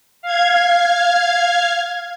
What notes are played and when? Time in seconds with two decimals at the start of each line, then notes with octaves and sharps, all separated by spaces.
0.22 F5 G#6